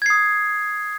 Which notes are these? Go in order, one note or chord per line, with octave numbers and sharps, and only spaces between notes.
D#6 G#6 C7